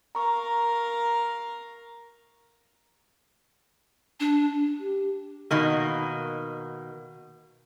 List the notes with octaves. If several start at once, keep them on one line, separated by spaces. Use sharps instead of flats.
A#4 F5 A#5 C#6
D4
G4
B2 D#3 A#3